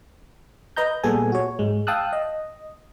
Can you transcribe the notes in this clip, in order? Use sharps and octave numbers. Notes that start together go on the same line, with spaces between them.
B4 D#5 A#5 G6
A#2 G3 B3 G#4 A4 G#5
F#4 C#5
G#2 G#3
F5 G5 A5 D#6 E6 F#6
D#5